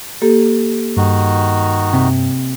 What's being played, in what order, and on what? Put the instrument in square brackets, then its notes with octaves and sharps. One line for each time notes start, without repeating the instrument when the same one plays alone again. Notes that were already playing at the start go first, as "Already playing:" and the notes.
[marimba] A#3 G4 A4
[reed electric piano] G2 [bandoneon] D#3 D#4 F#4
[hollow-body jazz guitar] C3